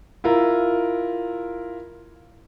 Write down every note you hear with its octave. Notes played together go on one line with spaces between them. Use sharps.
E4 F4 A#4